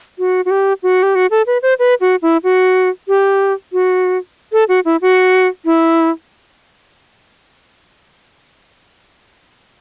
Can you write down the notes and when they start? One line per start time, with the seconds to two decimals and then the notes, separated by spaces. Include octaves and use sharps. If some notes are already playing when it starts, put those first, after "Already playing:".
0.19 F#4
0.45 F#4
0.51 G4
0.83 F#4
1.03 G4
1.15 F#4
1.31 A4
1.47 B4
1.63 C5
1.79 B4
2.01 F#4
2.22 E4
2.44 F#4
3.08 G4
3.73 F#4
4.53 A4
4.69 F#4
4.85 E4
5.02 F#4
5.65 E4